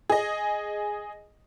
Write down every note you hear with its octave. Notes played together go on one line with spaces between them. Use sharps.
G#4 D#5